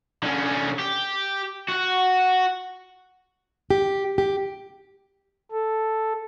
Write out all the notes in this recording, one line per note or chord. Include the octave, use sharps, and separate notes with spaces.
D3 C#4
G4
F#4 F#5
G4
G4
A4